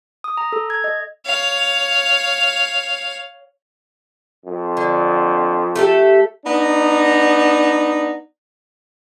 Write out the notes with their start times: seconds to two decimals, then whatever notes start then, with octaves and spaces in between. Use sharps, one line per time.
0.24 D#6
0.37 A#5
0.52 A4
0.70 G#6
0.84 D#5
1.26 C#5 F5
4.45 F2
4.77 D3
5.76 A3 G4 A4
6.45 B3 D4 D#4